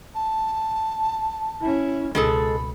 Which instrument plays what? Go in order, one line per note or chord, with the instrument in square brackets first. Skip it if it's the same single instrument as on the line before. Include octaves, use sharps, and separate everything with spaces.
[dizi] A5
[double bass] C#4 E4
[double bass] C#2 B2 [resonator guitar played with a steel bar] G#3 G#4 A4 [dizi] B5